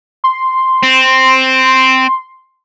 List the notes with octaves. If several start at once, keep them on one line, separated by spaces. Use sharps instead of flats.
C6
C4